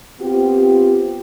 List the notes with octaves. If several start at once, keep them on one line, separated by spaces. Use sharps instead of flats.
B3 C4 F4 G4